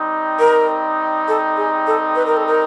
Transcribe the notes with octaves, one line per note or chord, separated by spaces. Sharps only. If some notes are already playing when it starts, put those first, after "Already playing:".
Already playing: G3 C4 D#4
A#4
A4
G#4
A4
B4
A#4
A4
A#4